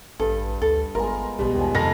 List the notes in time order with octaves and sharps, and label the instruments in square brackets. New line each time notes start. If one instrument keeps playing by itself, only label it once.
[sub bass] A1 [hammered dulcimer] G2 B4 [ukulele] A4
[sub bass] D2 [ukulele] A4
[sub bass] G#1 [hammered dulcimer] G#3 B3 F4 [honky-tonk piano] A#4
[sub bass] B1 [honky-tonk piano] B2 G3
[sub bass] E2 [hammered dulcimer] D#3 F3 G#3
[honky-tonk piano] F1 A#6 [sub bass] F2 [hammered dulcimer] A5 [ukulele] A#5